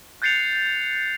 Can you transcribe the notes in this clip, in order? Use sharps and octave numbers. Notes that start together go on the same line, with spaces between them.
F#6 G6 A6 C7 C#7 F7